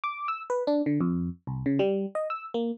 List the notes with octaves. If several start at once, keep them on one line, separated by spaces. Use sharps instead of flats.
D6
E6
B4
D4
D3
F2
C2
C#3
G3
D#5
E6
A#3